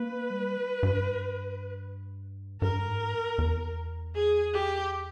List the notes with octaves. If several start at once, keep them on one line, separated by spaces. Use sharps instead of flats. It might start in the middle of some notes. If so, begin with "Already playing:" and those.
Already playing: A#3 B4
G3
G2
G2 A#4
G#2
E2
G#4
G4